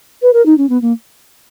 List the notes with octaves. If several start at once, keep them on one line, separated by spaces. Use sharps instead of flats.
B4
A#4
D#4
C#4
B3
A#3